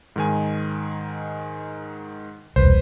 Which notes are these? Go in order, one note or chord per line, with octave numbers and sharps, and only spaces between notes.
G#2 D#3 G#5
E1 C2 B4 C5